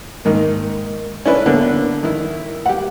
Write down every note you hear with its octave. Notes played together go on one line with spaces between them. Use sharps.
G#2 D#3 A#3
C#4 D4 E4 B4
D3 A#3 B3
D#3 E4
G4 F#5